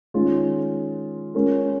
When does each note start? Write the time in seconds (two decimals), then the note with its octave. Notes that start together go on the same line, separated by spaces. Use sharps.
0.14 D#3 G#3 C#4 F4
1.35 G#3 C#4 F4 A#4